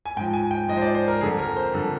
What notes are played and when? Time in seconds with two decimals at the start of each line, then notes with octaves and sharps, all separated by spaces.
0.05 G#5
0.17 G#2 G5
0.21 F3
0.33 G#5
0.51 G5
0.68 G#2 F3 D#5
0.77 C5
0.82 D5
0.95 C5
1.08 A#4
1.21 F2 D3 G3 G#4
1.39 A#4
1.57 C5
1.73 F2 D3 G3